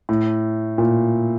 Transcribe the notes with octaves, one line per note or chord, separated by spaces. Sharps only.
A2
A#2